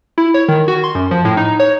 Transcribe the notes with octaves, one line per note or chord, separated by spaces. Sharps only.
E4
C#5
D#3
F#4
C6
F#2
F3
A2
D#4
C#5